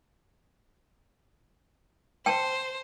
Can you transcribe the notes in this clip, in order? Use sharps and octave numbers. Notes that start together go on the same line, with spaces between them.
C5 G5 A5